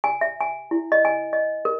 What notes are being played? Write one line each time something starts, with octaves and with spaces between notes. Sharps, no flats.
G#5
E5
G#5
E4
D#5
G#5
D#5
A#4